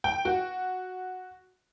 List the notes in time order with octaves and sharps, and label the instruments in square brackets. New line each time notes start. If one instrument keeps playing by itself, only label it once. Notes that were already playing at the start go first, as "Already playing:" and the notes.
[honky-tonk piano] G5
F#4